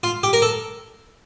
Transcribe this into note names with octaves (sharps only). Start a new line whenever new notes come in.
F4
G4
A#4
A4